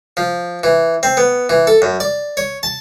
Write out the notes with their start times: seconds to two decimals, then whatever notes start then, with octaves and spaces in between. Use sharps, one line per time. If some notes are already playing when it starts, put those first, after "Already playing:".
0.17 F3
0.63 E3
1.03 C4
1.17 B3
1.50 E3
1.67 A4
1.82 F#2
2.00 D5
2.37 C#5
2.63 A5